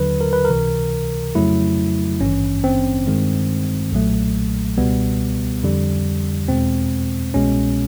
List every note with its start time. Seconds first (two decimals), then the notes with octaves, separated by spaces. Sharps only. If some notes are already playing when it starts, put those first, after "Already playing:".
Already playing: D#2 D3 F#3 B4
0.21 A#4
0.33 B4
0.44 A#4
0.50 C#2 C3 E3
1.35 F2 C#3 F#3 A3 E4
2.21 G#1 G2 E3 C#4
2.64 C4
3.07 G2 D#3 G#3
3.92 B1 A#2 F#3 A3
4.78 C#2 B2 G3 B3
5.63 F2 D3 G3
6.48 E2 B2 G#3 C4
7.34 C2 B2 G#3 C#4